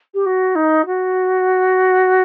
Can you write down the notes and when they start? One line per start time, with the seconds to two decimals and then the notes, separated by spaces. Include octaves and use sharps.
0.14 G4
0.26 F#4
0.55 D#4
0.86 F#4